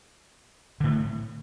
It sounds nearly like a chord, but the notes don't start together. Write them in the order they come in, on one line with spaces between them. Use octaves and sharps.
D3 A2 A3